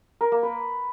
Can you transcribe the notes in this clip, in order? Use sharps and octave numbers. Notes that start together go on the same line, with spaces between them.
A#4
A#3
B4